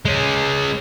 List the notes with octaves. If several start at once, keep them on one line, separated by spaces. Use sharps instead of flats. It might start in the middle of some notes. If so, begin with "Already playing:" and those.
G#3 C#4